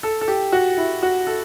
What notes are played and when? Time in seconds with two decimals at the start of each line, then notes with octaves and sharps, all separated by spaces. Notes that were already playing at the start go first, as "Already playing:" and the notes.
0.03 A4
0.21 A4
0.28 G4
0.52 F#4
0.77 E4
1.03 F#4
1.27 A4